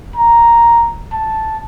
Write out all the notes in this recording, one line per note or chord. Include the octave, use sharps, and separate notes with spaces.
A#5
A5